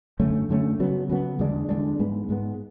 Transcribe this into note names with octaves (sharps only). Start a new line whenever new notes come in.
F#2 D3 A3 C#4
F#2 D3 A3 C#4
C#3 F#3 B3
C#3 F#3 B3
E2 D3 G#3 D4
E2 D3 G#3 D4
G#2 G#3 B3
G#2 G#3 B3